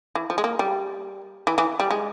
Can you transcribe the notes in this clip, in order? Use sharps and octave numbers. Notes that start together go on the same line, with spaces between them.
E3
F3
G#3
A#3
G3
E3
E3
G3
G#3